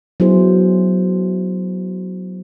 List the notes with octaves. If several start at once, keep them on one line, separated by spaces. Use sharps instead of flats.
F#3 B3 E4 F#4 G#4 C5